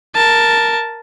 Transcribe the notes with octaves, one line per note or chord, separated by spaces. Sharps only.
A#4 A5